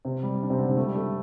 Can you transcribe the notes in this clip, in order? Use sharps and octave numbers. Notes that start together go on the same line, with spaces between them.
C3 C4
G3
D4
C3 C4
D3 D4
C3 C4
A3
G3
A3